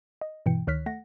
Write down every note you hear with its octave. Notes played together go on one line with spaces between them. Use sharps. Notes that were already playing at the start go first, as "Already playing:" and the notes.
D#5
G2 B2 E3 G5 C#7
D2 D#3 C#5 F6 F#6 B6
A3 F#5 A#6